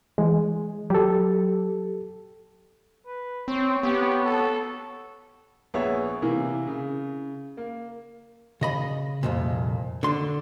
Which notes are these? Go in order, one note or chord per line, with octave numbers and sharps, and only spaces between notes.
E3 G#3
F#3 G4 A4
B4
C4 C#5
B3 G4
A4
A#1 B3 G#4 C#5 E5
C3 E3 A#3 E4
C#3
A#3
C#3 D#5 B5
C2 F2 A#2
D3 C6